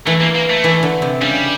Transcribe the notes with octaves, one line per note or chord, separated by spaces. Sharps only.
E3 A3
A#3
A#3
A3
E3
D3
C3
C#3 G3